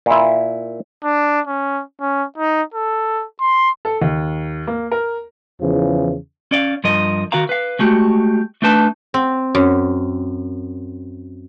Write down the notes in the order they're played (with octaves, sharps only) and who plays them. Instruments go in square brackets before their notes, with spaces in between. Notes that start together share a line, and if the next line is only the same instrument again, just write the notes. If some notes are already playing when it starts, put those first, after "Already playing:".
[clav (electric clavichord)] A#2 E4
[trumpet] D4
C#4
C#4
D#4
A4
C6
[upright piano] A4
D#2
A#3
A#4
[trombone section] E2 C#3 E3 F3
[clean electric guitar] C#4 D5 D#5 F5
G2 F3 A#4 D#5
D#3 F#4 A#4 F5 A#5
B4 F5
G#3 A3 F#4 G4
A3 D4 D#4 B4 A5
[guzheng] C4
F#2